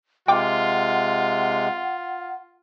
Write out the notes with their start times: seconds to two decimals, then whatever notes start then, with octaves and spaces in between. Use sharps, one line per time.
0.28 C3 G#3 F4 F#5 G5 D6